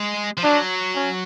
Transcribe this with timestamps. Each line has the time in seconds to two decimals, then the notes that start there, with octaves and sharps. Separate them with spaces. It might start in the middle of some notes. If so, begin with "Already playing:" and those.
Already playing: G#3
0.37 F3
0.44 F#3 D4
0.95 C#4